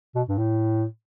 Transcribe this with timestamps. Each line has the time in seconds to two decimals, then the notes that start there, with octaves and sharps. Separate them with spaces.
0.15 B2
0.28 G2
0.38 A2